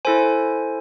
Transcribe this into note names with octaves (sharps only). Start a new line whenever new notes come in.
E4 A4 C5 G#5